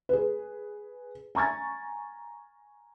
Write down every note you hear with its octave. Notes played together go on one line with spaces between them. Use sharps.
G#4 B4
G#5 A#5 C#6 G#6 A6